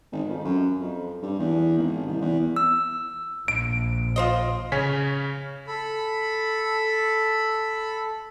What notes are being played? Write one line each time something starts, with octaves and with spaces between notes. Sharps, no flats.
G#1
F2
F#2
F2
G2
E2
G#1
C2
E2
E6
A#1 D7
F4 C5 D#5
C#3 C#4 C#5 G#5 B6
A4 B5